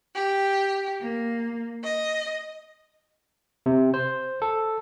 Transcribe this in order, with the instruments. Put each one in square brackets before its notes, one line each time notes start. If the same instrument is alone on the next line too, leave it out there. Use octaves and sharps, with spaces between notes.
[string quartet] G4
A#3
D#5
[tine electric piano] C3
C5
A4